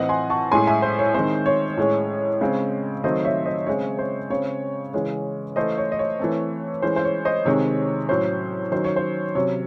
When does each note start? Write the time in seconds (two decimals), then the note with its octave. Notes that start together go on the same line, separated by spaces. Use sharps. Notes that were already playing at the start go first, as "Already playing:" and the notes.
Already playing: A2 E3 C4 D#5 F#5
0.09 G#5 C6
0.30 A5 C#6
0.51 A2 G#3 C#4 G#5 C6
0.67 E5 G#5
0.82 C5
0.99 C#5
1.14 D#3 G#3 C4 C5
1.46 C#5
1.77 A2 G#3 C#4
2.41 C#3 G#3 C4
3.04 D#3 F#3 A3 C4 C5 D#5
3.24 C#5 E5
3.46 C5 D#5
3.66 C#3 G#3 C4 C#5
3.99 C5
4.30 C#3 G#3 C4 C#5
4.93 C#3 E3 G#3 C#4 C#5
5.56 E3 A3 C#4 C5 D#5
5.78 C#5
5.92 D#5
5.99 C#5
6.19 E3 A3 C4
6.82 E3 G#3 C#4 C5
6.96 C5
7.04 C#5
7.25 C5 D#5
7.45 C3 D#3 G#3 C4 C#5
8.09 A2 F#3 C#4 C5
8.72 D#3 F#3 C#4 C5
8.84 C#5
8.96 C5
9.35 C3 F#3 C#4 C#5